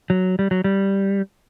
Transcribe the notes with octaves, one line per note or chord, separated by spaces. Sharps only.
F#3
G3
F#3
G3